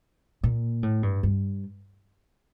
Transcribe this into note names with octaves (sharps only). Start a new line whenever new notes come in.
A#2
A2
G2
G2